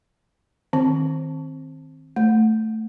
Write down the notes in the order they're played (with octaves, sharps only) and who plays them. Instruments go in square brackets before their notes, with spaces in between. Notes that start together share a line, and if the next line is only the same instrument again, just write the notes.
[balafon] D#3 C4
A3